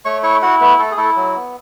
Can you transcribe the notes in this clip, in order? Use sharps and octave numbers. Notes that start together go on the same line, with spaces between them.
A3 C#5 C#6
E4 C#5 C#6
E4 F#4 F#5
A3 B3 B4
A3 A4
G#4
A3 E4 A4
F#3
B3